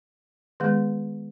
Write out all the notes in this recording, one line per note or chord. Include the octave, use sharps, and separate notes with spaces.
D#3 G#3 B3 G#4